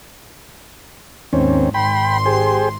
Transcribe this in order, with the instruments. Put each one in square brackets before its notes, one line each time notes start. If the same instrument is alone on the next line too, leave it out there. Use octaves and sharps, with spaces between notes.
[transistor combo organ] D#2 C4 C#4 [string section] G#2
[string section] G#1 C6 [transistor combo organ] G5 B5
[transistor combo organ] G4 G#4 C5